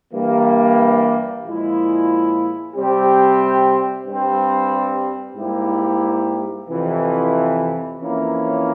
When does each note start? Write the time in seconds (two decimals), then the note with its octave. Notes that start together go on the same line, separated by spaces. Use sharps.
0.13 G2 E3 G3 A#3
1.44 A#2 F3 G#3 E4
2.75 C3 G3 C4 G4
4.05 G2 G3 C4
5.36 G#2 G3 A#3 E4 G4
6.68 F2 C3 E3
7.99 F2 E3 A#3 C#4 E4